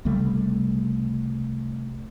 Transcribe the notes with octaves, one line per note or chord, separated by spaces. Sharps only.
C2 C#3 G3 A3